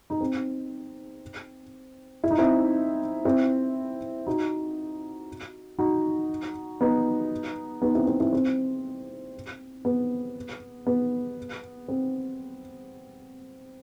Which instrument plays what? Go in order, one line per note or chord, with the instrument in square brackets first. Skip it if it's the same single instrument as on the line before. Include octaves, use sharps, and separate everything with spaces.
[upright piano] D#4
C4
E4
D#4
C4 E4
C4 E4
D#4 F#4
D#4 F#4
B3 D#4
B3 D#4
C4 E4
C4 E4
C4 E4
C4
B3
B3
C4